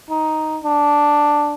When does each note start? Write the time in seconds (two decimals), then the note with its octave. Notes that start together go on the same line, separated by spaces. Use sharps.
0.10 D#4
0.64 D4